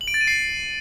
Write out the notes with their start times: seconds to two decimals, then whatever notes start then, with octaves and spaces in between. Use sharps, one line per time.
0.01 F#7
0.08 D7
0.14 A6
0.21 D#7
0.28 C7